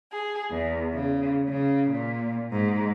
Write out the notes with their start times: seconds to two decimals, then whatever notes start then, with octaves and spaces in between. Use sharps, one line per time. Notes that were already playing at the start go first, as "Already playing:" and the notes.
0.12 G#4
0.51 E2
0.94 C#3
1.48 C#3
1.91 A#2
2.52 G#2